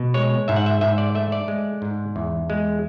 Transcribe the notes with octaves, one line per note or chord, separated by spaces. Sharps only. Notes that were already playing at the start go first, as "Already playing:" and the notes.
Already playing: B2
G#3 C#5
G#2 E5
F#5
E5
G#2 E5
D5
A3 E5
D5
G#3
G#2
E2
G#3